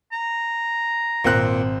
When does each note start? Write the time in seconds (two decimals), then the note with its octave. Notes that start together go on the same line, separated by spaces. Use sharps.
0.12 A#5
1.25 G#1 A#2 C4 F#6